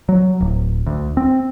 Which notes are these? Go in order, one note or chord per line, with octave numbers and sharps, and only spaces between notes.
F#3
D1
D2
C4